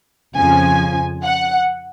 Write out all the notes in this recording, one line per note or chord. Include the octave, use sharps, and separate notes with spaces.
F2 C#3 F3 G#5
F#5